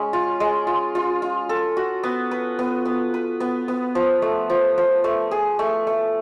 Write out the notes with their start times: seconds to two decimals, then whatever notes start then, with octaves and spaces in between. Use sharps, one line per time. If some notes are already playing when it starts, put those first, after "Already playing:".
Already playing: G#3 C#4
0.13 F4
0.40 G#3
0.67 F4
0.95 F4
1.22 F4
1.49 A4
1.77 F#4
2.03 B3
2.31 B4
2.59 B3
2.85 B3
3.14 B4
3.40 B3
3.68 B3
3.95 F3
4.22 A3
4.50 F3
4.78 F3
5.04 A3
5.31 G#4
5.59 A3
5.87 A3